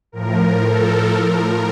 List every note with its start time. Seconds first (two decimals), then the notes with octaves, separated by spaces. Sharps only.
0.12 A2 F3 A#4
0.64 A4
1.14 A2 F3 A#4